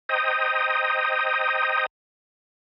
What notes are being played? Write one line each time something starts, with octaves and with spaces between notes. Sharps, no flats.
C5 D#5 G5 A#5 D#6